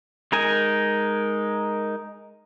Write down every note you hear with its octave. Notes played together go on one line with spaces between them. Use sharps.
G#3 D#4 A#4 G#5